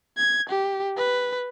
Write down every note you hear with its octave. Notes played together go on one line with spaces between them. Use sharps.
G#6
G4
B4